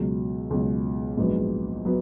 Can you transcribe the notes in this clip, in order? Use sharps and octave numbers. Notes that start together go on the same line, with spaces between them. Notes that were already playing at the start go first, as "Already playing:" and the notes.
Already playing: C#2 B2 F#3
C#2 B2 F#3
A#1 G#2 F#3 B3
F#3 B3